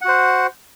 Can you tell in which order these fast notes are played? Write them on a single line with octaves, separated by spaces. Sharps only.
F#5 F#4 C5